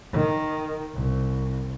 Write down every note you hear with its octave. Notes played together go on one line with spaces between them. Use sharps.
D#3
C2